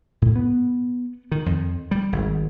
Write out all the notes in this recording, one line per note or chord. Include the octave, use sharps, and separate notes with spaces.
A2
B3
D#3
F2
G3
G#1